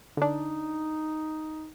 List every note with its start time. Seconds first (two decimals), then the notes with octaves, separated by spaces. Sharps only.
0.17 D3 D4 D#4